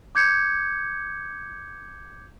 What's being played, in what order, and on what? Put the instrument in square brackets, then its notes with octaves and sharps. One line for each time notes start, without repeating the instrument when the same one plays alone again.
[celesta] D6 G6 G#6 C#7